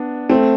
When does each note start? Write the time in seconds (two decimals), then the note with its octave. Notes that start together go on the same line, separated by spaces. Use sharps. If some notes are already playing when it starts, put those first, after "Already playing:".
Already playing: B3 D4
0.30 A3 C4